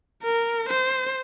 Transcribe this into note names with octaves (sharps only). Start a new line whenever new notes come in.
A#4
C5